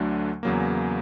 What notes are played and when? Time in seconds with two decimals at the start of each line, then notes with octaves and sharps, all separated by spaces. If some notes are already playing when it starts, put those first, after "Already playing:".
Already playing: D2 D3 F#3 A3 D4
0.43 E2 C#3 F#3 A#3